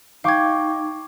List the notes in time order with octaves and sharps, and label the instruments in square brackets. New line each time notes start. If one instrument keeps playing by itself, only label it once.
[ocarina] D#4 [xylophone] F5 G#6 [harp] G5 C#6 D6